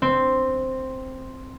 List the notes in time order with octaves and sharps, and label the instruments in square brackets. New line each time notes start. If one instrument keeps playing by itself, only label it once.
[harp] C4